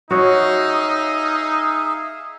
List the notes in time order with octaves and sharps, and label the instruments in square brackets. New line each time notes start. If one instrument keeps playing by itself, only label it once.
[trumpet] D#4 [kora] F#4 C#5 [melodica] G#4 E5 F5